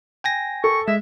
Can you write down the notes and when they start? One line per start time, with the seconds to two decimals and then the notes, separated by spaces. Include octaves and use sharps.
0.24 G5 G#5 A#6
0.64 A4 C#6
0.88 G#3 E5